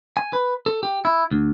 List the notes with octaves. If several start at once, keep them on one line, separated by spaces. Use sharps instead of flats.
G#5
B4
A4
G4
E4
D2